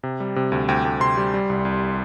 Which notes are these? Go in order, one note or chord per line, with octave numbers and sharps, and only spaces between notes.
C3
G3
C3
D2
D2 G5
D2
C3 C6
G3
G3
C2
C2